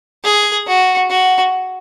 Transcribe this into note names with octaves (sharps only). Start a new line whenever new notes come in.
G#4
F#4
F#4